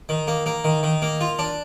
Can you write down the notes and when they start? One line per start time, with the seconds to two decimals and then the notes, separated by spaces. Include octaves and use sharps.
0.09 D#3
0.28 A#3
0.46 A#3
0.64 D#3
0.83 D#3
1.02 A#3
1.21 F4
1.39 D4